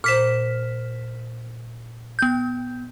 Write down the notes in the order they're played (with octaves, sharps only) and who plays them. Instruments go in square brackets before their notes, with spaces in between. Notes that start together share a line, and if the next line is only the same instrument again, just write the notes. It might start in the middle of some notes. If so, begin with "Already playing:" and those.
[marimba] A#2 C5 [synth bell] F6 B6 E7
[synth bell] B3 G6